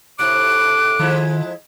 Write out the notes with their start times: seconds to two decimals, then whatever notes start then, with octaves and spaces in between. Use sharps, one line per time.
0.19 A2 C3 D6 F#6
0.99 D#3 F3 G#3 E4